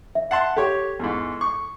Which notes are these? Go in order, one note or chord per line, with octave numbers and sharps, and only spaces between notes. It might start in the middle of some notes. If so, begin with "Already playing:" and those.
E5
F#5 A5 C6
G4 A4 C#5
E2 G#2
C#6